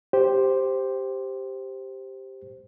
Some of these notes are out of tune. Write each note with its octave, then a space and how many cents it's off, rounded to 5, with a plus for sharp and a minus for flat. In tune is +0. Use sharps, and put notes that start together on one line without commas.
G4 +0 C5 +0